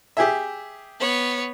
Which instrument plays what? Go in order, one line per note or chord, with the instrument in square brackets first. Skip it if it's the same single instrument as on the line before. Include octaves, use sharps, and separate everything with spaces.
[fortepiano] G4 G#4 E5
[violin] B3 C#5